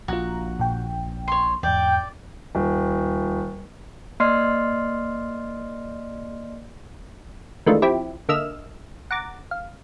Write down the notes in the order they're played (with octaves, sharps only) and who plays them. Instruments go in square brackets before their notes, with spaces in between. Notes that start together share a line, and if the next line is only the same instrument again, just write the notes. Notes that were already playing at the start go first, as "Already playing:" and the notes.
[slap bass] A#1 [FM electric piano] F4 A#5 [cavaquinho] F#4
[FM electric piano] A#2 G5
[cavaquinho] C#5 C6
[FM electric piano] E2 G#2 [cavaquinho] D5 [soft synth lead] G5
[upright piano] D#1
[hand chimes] A#3 D5 D#5 C6 F6 C7
[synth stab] D#3 E3 G#3 A3 D4 F4
F3 C4 E4 G4
D3 A#3 D#5 E5 F6 E7
F#5 A#5 D6 A6
F5